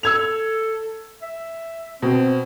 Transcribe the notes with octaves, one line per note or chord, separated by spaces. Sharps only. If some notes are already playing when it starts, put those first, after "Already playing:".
A4 E6 G#6 F7
E5
B2 C4